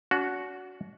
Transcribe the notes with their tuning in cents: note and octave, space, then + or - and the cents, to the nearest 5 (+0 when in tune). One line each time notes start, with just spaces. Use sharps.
D4 -45 F#4 +0